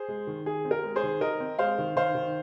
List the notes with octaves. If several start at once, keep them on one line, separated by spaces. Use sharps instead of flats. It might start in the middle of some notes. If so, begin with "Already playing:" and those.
Already playing: G#4 C5
G#3
D#3
D#3 G#4
C4
A#4
G#3
G#4 C5
D#3
D#3 A#4 D#5
C4
G#3 C5 F5
D#3
D#3 C5 F5
D#3